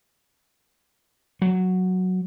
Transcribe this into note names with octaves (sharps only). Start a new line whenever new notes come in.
F#3